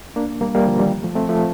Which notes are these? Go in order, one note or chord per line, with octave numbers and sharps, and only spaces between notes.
A#3 D4
G3 A#3
G3 A#3
D3 F3
D#3 G3
F3 A3
A3 C4
F3 A3